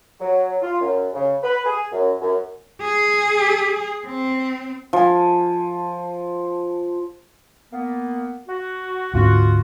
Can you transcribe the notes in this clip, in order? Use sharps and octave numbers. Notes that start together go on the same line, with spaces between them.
F#3
F4
F#2
C#3
B4
G#4
F#2
F#2
G#4
C4
F3 G#5
A#3 B3
F#4
D2 G#2 C#4 F4 F#4